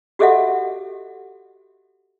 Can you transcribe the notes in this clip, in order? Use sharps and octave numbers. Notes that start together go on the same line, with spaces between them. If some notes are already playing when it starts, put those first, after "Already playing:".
F#4 G4 A4 D#5 E5 F#5